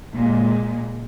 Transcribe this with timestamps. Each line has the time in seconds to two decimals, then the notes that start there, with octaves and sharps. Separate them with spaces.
0.15 A#2 G#3